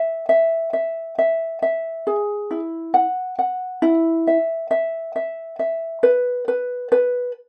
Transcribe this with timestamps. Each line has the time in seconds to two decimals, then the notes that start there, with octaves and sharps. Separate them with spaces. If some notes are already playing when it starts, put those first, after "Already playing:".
Already playing: E5
0.29 E5
0.73 E5
1.18 E5
1.62 E5
2.07 G#4
2.51 E4
2.94 F#5
3.39 F#5
3.82 E4
4.27 E5
4.71 E5
5.16 E5
5.59 E5
6.03 B4
6.48 B4
6.92 B4